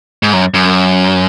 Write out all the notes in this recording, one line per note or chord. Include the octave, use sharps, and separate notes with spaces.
G#2
F#2
F#2